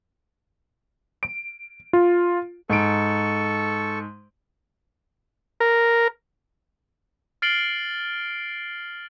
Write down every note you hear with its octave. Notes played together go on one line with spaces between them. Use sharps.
D7
F4
G#2 A4 C#6 D7
A#4
F6 A6 C7 D7 F#7 G7